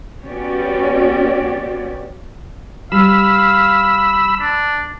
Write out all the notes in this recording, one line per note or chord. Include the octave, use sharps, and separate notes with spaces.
B3 C#4 F#4 G4 C#5 D5
G3 F5 B5 E6
D4